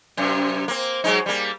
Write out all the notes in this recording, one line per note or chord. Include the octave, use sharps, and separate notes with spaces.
F#2 C3
A#3 C4
F#3 G#3 D#4
G3 A#3